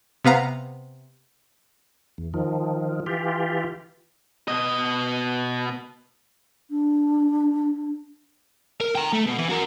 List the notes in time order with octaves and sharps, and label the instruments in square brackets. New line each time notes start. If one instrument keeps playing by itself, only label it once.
[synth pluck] C3 B3 F5 A#5
[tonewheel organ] E2
D#3 F3
E3 F4 G4
[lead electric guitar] B2 D#5
[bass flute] D4
[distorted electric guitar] A#4
G5 A#5
A3
B2
E3
F#4 A#4